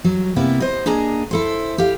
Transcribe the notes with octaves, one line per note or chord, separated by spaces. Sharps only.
F#3
C3 A#3 B3 E4
C5 D#5
A#3 D4 G#4 D#5 G#5 A#5
E4 A4 C5
G4 F5